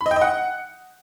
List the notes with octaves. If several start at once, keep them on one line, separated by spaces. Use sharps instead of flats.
B5
D#5
G5
D#5
F#5